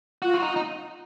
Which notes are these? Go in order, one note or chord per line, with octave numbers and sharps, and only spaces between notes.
F4 F#4
F4
D#4
D#4